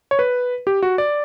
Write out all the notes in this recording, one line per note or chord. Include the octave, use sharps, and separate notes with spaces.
C#5
B4
G4
F#4
D5